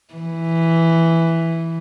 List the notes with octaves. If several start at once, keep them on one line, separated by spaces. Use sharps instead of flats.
E3